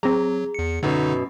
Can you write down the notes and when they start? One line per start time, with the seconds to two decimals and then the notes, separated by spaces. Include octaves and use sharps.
0.03 F#3 C4 G#4 A#5
0.54 E2 C#7
0.83 F#2 B2 D3 D#4